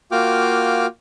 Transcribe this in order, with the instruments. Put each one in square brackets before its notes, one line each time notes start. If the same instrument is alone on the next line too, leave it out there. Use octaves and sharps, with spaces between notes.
[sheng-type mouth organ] A#3 F4 F#4 G5 D6 F6